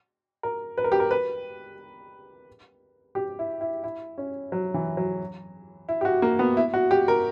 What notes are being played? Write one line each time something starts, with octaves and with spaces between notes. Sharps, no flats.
A#4
B4
A#4
G4
A#4
B4
G4
E4
E4
E4
C#4
F#3
E3
F#3
E4
G4
F#4
A#3
B3
E4
F#4
G4
A#4